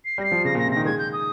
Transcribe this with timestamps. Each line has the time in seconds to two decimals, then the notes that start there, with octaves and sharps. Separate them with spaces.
0.05 C7
0.18 G3 A#6
0.24 C7
0.32 F3
0.45 C#3 A#6
0.55 A#2 A#6
0.66 C3
0.72 D#3 A#6
0.85 G#3 G#6
0.99 G6
1.13 D#6